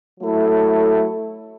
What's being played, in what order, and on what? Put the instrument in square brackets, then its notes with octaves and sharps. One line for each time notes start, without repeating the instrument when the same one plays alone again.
[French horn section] F#3 A3 E4 A4